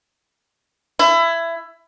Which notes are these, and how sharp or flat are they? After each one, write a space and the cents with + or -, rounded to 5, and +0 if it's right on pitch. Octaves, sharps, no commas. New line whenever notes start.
E4 +20